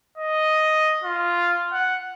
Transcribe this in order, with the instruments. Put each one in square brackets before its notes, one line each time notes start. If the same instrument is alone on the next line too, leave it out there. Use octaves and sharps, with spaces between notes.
[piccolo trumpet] D#5
F4
F#5